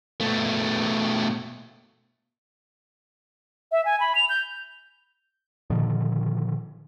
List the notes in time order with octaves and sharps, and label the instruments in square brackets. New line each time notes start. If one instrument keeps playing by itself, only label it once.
[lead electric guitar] B2 A3
[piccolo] E5
G#5
B5
F7
G6
[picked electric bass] A#2 D3 D#3 F3